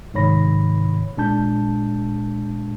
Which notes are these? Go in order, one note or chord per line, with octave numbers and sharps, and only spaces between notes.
G#2 C3 D#3 C#5 B5 A#6
A#2 G#3 D4 A5 G6